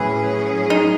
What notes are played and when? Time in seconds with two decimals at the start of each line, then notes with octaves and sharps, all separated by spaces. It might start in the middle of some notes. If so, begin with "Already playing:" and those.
Already playing: A2 E3 F#3 C#4 G#4
0.70 D#4